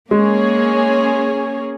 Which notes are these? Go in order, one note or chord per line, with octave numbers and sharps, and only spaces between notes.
G#3 A#3 C#4 G#4 C#5